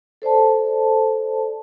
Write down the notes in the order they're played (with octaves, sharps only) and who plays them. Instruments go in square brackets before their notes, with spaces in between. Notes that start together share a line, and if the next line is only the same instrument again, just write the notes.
[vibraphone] A4 C5 D5 A5